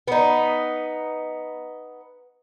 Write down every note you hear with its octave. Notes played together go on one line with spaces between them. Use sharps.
B3 D#4